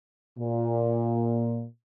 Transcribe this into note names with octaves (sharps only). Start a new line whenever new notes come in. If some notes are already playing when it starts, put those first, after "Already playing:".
A#2